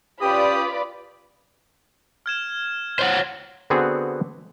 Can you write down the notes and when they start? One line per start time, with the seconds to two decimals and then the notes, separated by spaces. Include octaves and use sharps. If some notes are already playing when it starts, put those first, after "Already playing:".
0.21 C#4 F4 G4 B4 D5 B5 D#6
2.26 F6 G#6 E7
2.99 C5 C#5 F#5 F6 A6
3.70 D3 B3 C4 F#4 G#4